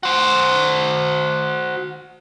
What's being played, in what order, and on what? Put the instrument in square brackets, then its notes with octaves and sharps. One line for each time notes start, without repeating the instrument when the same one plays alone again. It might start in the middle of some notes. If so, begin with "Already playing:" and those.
[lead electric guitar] F#4 C5